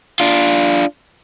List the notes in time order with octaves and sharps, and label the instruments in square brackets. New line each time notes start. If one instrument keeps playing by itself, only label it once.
[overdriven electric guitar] D4 F4